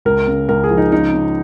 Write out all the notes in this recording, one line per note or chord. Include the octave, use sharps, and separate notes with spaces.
C#2 A#4
C#3
C#2 A#4
G#4
F3
D#4
C#3 D#4
C#3